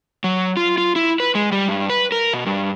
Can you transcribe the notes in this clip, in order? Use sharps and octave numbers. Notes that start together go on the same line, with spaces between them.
F#3
F4
F4
E4
B4
G#3
G3
G2
B4
A#4
B2
G2